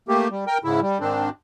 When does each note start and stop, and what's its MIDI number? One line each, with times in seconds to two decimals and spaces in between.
0.08 0.28 57
0.08 0.28 58
0.08 0.28 67
0.31 0.45 55
0.47 0.58 70
0.47 0.58 79
0.64 0.80 44
0.64 0.80 49
0.64 0.80 64
0.82 0.98 55
1.00 1.29 44
1.00 1.29 51
1.00 1.29 60
1.00 1.29 62